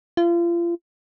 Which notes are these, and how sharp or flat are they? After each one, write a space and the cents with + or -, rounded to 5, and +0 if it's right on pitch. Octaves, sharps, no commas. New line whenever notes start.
F4 -35